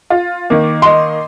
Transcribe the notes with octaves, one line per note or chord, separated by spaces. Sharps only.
F4
D#3 A#3
D#5 C6